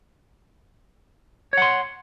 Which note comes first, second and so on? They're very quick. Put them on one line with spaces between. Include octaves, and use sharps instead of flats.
C#5 F#5 C6